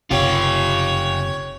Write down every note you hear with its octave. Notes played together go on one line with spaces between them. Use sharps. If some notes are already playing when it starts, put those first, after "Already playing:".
F#1 C3 F4 G4 C#5